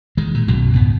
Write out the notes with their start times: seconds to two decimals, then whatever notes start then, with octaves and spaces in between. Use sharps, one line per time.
0.17 D#3 G#3
0.34 A#2
0.48 B1 F#2 B2
0.73 C#2 G#2 B3